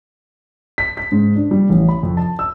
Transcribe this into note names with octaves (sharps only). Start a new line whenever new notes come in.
B6
B6
G#2
D4
G3
A1
B5
F2
A5
E6